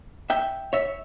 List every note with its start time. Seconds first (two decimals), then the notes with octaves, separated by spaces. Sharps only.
0.30 E5 G5
0.73 C#5 E5